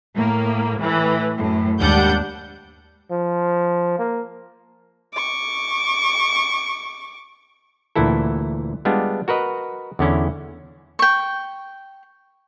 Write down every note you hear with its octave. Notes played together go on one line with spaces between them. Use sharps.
A2 A#3
A2 E3
F#2 A2
D#2 G#2 G3 D4 F#5 G6
F3
A#3
C#6 D6
D2 A#2 E3 E4 A4
G3 G#3 B3 D4 F4
F#4 A#4 B4 D#5
E2 D3 C#4 E4
G5 C#6